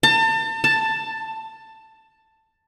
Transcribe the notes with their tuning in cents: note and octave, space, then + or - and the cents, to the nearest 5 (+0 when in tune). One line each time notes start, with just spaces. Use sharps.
A5 +35
A5 +10